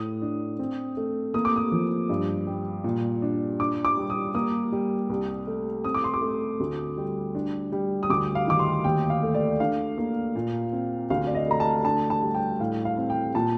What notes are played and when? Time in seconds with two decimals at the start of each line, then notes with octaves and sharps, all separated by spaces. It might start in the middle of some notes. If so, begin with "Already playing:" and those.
Already playing: A2 D#6
0.22 D4
0.59 C4
0.97 A3
1.34 A#3 D#6
1.45 D6
1.56 D#6
1.72 F3
2.10 G2
2.47 G3
2.84 A#2
3.22 D4
3.60 D4 D6
3.85 D6
3.97 G3
4.10 D#6
4.35 A#3 D#6
4.72 G3
5.10 C2
5.47 A3
5.84 C4 D#6
5.94 D6
6.04 C6
6.14 D6
6.22 A3
6.60 D2
6.98 G3
7.35 D4
7.72 G3
8.03 D#6
8.10 D2 D6
8.35 F5
8.47 D#3 D6
8.59 C6
8.84 D#2 G5
9.10 F5
9.23 A3
9.34 D5
9.60 D4 F5
9.98 A#3
10.35 A#2
10.73 C4
11.10 D2 F5
11.27 D5
11.35 D#5
11.47 A3 A#5
11.60 A5
11.85 D4 A5
12.10 A5
12.22 G3
12.34 G5
12.59 A2 F5
12.85 F5
12.98 C4
13.10 G5
13.35 A#2 A5